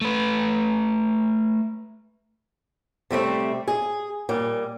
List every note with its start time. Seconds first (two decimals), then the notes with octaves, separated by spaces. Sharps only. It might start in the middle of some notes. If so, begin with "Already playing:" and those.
0.01 A3 B4
3.10 C3 G3 A3 C4
3.68 G#4
4.29 A#2 G3